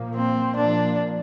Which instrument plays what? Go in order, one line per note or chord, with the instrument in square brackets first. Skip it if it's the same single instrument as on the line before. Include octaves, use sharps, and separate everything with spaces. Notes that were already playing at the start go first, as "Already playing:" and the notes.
Already playing: [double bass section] A#2 F3 A#3
[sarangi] C4
[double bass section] A#2 F3 A#3 [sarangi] D4